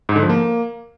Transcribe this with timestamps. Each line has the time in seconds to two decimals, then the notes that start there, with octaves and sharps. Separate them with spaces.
0.09 G#2
0.16 D3
0.23 F3
0.30 A#3